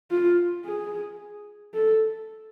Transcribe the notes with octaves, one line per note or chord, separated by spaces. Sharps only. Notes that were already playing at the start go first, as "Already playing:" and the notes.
F4
G#4
A4